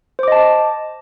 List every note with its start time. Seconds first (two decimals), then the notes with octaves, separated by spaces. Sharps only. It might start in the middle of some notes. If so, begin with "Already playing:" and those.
0.19 C5
0.23 D6
0.28 D#5
0.32 A5